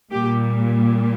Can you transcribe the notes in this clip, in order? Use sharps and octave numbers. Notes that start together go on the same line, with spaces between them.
A#2 G3 G4